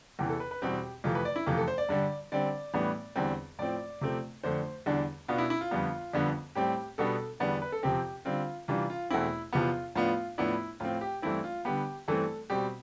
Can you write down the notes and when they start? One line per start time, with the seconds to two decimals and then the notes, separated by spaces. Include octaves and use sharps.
0.19 E2 C3 E3 G4
0.29 A4
0.40 B4
0.51 B4
0.62 E2 B2 G3 C4 G4
1.04 F2 C3 E3 A3 F4
1.15 B4
1.25 D5
1.36 E4
1.46 F2 C3 E3 A3 F4
1.57 A4
1.68 C5
1.78 D5
1.89 G2 D3 G3
2.32 D3 G3 C4 D5
2.74 A2 E3 G3 B3 D4
3.16 E2 D3 G3 C4
3.59 A2 F3 C4 D5
4.01 C3 F3 A3 C4
4.43 F2 D3 A3 D4 C5
4.86 E2 D3 G3 D4
5.28 B2 B3 D4 F4
5.38 E4
5.50 E4
5.61 F4
5.71 F2 D3 G3 B3
6.13 F2 D3 G3 B3 D4
6.55 A2 G3 C4 G4
6.98 B2 G3 B3 D4 A4
7.40 E2 D3 G3 B3 D4 D5
7.51 D5
7.62 B4
7.72 A4
7.83 F2 C3 F3 C4 G4
8.25 D3 G3 C4 F4
8.68 C3 E3 G3 D4 F4
8.90 F4
9.10 E2 B2 A3 C4 E4
9.53 E2 C3 F3 B3 F4
9.95 A2 F3 B3 D4 F4
10.38 A2 F3 B3 D4 E4
10.80 A2 F3 C4 F4
11.01 G4
11.22 G2 E3 A3 C4 E4
11.44 F4
11.65 D3 G3 B3 G4
12.08 G2 E3 A3 C4 A4
12.50 B2 G3 C4 G4